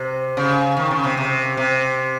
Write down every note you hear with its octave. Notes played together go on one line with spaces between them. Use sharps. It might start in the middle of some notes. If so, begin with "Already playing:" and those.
Already playing: C3
C#3
D#3
C#3
C3
C3
C3